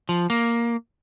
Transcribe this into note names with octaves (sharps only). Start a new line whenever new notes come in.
F3
A#3